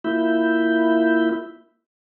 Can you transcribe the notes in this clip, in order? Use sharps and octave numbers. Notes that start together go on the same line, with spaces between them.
A#3 E4 F4 E5 B5 G6